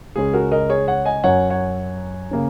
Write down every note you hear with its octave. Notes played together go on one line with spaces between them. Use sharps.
C#2 C#3 G#3 C#4 G#4
F#4 A#4
A#4 D#5
G#4 C#5
C#5 F#5
D#5 G#5
F#2 F#3 C#4 C#5 F#5
C#5 F#5
C#3 A#3 C#4